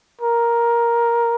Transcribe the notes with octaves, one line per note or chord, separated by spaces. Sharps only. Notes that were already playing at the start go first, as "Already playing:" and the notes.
A#4